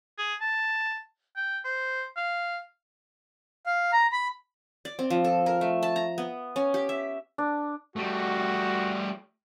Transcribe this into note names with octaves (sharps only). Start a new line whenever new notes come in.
G#4
A5
G5
C5
F5
F5
A#5
B5
D5
C4
F3
A4
A#4
A3
A5
A#5
B3
C#4
G4
E5
D4
G3 A3 F#4